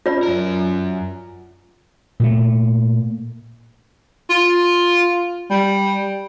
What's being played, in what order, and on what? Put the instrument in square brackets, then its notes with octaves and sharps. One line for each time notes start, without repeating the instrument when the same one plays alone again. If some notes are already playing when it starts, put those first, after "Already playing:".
[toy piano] F4 D5
[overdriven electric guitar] F#2 A#4
[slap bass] A#2 A3
[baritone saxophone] F4
G3